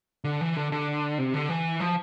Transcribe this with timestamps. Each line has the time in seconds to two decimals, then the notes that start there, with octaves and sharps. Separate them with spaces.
0.24 D3
0.41 E3
0.57 D3
0.72 D3
1.18 C3
1.34 D3
1.49 E3
1.80 F3